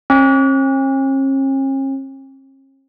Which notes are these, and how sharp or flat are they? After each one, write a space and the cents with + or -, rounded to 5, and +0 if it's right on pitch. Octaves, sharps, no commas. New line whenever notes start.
C#4 -45